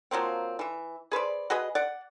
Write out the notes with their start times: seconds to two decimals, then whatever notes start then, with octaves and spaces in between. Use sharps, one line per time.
0.11 F3 F#3 A#3 C4
0.59 E3 E5
1.11 G#4 B4 C5 D5
1.50 F#4 G#4 B4 D#5
1.75 D5 F#5